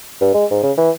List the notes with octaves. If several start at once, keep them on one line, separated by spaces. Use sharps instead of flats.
G2
G#3
G#2
C#3
E3